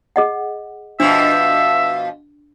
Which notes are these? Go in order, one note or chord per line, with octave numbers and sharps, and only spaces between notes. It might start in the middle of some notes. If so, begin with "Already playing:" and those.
G#4 D#5 F#5
B2 F3 D4 E5